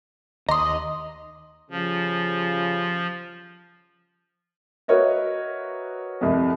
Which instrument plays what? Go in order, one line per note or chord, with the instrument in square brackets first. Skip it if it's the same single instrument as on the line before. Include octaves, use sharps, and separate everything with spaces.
[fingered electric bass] D#2 [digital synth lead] D#5 [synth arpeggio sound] A#5 C6 [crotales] D6 D#6
[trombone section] C#3 G3 F4 [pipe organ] F3
[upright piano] F#4 A#4 B4 C#5 D#5 E5
C2 F2